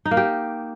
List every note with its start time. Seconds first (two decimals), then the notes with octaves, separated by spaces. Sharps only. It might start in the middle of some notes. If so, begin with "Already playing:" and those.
0.05 D#4
0.11 A#3
0.17 G4